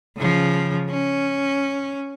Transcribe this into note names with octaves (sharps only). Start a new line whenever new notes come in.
C#3 F3
C#4